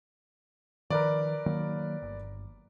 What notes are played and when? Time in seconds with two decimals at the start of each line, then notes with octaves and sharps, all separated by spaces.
0.90 D#3 F3 A#4 B4 D5
1.46 D#3 F#3 A#3
2.02 G1